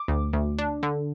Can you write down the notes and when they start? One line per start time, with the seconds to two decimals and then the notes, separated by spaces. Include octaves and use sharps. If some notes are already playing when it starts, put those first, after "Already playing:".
Already playing: D6
0.08 D2
0.33 D2
0.59 D4
0.83 D3